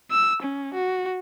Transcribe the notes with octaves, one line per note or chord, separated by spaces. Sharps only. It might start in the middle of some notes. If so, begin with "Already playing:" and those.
E6
C#4
F#4